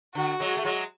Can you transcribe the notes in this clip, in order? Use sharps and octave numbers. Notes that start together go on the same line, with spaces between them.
D3 F#4
F#3 G#3
A3
F#3 G#3